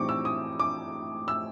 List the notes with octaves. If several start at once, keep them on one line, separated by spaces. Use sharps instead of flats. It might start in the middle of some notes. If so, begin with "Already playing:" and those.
Already playing: A2 E3 G3 C4 D#4 C#6 D6
E6
D#6
D6
E6